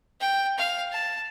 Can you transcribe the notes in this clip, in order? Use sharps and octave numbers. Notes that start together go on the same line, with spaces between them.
G5
F5
A5